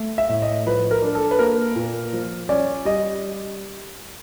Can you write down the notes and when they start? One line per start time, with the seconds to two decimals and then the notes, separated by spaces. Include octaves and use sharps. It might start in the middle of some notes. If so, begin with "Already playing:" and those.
Already playing: A3
0.18 E5
0.29 A2
0.42 D#5
0.66 F3 B4
0.91 A#4
1.02 D4
1.15 A4
1.31 B4
1.39 A#3 A#4
1.76 A#2
2.13 F3
2.49 C#4 D5
2.85 G3 D#5